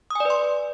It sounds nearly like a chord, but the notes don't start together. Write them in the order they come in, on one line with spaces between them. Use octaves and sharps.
D#6 G#5 D5 B4 C6